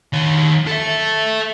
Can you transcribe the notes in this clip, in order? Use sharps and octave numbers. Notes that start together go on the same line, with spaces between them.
D#3 C#5
A4 E5